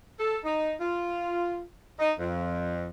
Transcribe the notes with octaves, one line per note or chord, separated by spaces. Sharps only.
A4
D#4
F4
D#4
F2